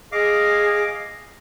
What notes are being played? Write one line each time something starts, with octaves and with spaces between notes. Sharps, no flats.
G#4 D#5 F5 D6